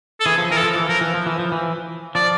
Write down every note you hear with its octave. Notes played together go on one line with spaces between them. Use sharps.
A4
E3 G#4
F3
E3 A#4
A4
F3
E3
F3 A#4
E3
F3
E3
F3
E3
F3 D5